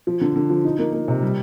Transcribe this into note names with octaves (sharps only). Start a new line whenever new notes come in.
F3
D3
D3
F3
D#4
A#3
A#3
C3
G3